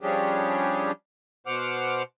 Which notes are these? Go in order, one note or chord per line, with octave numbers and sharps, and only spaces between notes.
F3 G3 C#4 D4 G4 G#4
B2 C5 F#5 D6 F6